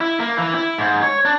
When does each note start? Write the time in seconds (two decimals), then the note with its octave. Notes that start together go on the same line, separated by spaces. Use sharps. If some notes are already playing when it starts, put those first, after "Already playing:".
0.01 E4
0.20 A#3
0.37 E3
0.54 E4
0.78 G#2
1.03 C#5
1.25 D4